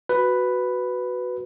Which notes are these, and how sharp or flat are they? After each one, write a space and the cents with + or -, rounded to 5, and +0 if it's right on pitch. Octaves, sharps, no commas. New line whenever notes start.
F#4 +0 B4 +5